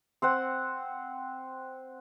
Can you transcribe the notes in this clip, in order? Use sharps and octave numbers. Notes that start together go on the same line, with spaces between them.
C4 C5 F#5